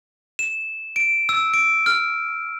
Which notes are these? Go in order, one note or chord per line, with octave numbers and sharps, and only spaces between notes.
E7
D7
E6
D7
F6